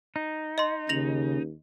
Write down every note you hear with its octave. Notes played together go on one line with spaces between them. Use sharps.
D#4
D#5 C6
D#2 C#3 A#6 F7 F#7